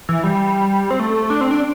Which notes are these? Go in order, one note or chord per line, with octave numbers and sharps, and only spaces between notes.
E3
G3
C4
A3
D4
C4
D4